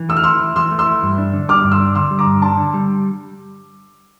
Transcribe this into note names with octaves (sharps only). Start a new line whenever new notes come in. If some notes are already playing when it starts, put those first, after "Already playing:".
Already playing: E3
A3 E6
F6
E4 C6 E6
E3
E3 C6 E6
A3
C6 E6
E4
G2
D4
D3
G3 D6 F6
G2
C6 E6
D4
D3 C6 E6
G3
A#5 D6
G2
D4 A5 C6
D3
G3